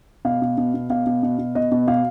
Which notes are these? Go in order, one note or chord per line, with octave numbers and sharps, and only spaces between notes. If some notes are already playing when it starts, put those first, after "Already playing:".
B2 F5
B2
B2
B2
B2 F5
B2
B2
B2
B2 D#5
B2
B2 F5